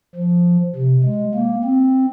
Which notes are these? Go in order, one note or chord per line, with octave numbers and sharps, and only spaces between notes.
F3
C3
G#3
A#3
C4